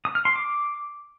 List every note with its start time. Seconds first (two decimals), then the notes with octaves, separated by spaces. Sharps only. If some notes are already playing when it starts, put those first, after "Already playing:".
0.05 D#6
0.15 F6
0.25 C6
0.35 D6